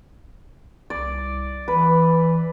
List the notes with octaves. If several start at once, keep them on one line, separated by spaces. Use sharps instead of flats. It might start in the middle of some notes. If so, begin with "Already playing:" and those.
C2 D5
E3 B4